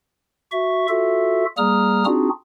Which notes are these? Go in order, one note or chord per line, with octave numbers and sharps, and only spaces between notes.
F#4 E5 C#6
F4 F#4 A4 E5
G3 A#3 G#4 A#5 D#6 F6
C4 D4 D#4 F4 F#4 G#4